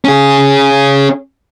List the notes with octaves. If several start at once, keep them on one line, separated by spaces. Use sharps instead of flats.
C#4 G#4